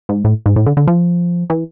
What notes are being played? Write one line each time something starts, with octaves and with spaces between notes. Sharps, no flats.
G#2
A2
G#2
A2
D3
D3
F3
E3